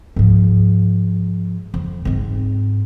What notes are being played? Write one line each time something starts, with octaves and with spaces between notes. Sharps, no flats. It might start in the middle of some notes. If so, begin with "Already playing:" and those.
G#2 F3
F2
G#2 C4